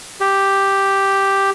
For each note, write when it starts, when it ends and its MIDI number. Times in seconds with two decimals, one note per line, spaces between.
0.21 1.50 67